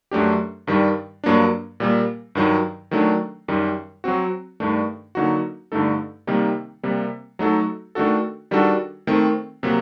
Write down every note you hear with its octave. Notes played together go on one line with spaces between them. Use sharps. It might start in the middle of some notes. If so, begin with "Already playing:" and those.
F#2 F#3 A3 D4 G4
G2 D#3 G3
G2 F#3 A#3 D4
A#2 G3 A#3
G2 D#3 F#3
D#3 F#3 A3 D4
F#2 D#3 G3
F#3 C4 F#4
G2 D#3 A3 D4
D3 F#3 A#3 D#4 F#4
G2 D3 A3 D#4 A4
C3 D#3 G3 A#3 D#4
C3 G3 A#3
F#3 A3 D#4 F#4 A4
D#3 A3 D4 F#4 A4
D#3 G3 D4 F#4 A4
D#3 A3 C4
C3 F#3 A#3